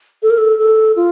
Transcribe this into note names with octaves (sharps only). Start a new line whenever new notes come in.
A4
A#4
A4
A4
F4